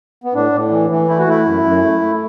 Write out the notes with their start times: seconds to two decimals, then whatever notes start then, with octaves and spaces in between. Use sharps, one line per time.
0.24 B3
0.34 A2 D4
0.52 A2
0.71 E3
0.90 E3
1.08 A3 E4
1.19 F#4
1.27 A3 E4
1.45 F#2
1.64 F#2
1.82 A3
2.01 A3